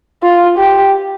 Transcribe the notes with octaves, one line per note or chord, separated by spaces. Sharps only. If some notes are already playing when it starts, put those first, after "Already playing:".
F4
G4